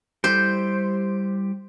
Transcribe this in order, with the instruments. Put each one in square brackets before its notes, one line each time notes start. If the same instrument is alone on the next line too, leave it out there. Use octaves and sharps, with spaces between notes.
[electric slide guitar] G3 E4 G4 [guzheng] C5